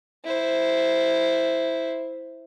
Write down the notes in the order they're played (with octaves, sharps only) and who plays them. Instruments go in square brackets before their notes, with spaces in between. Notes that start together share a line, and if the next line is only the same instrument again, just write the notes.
[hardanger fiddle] E4 C5